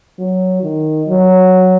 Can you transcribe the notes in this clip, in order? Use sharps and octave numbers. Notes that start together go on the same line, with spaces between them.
F#3
D#3
F#3